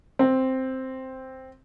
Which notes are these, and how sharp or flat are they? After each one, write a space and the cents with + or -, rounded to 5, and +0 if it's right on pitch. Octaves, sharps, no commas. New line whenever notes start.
C4 +0